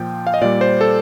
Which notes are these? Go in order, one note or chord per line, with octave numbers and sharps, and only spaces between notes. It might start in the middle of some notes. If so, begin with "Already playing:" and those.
Already playing: A#2 F3 G5
F5
D#5
A#2 G3 D5
C5
A4